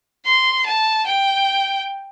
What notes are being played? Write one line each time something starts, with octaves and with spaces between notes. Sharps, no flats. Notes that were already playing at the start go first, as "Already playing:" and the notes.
C6
A5
G5